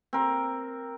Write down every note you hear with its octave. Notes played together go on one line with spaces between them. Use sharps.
C4 A#4